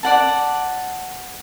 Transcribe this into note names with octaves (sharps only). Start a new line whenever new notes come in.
D5 F#5 A5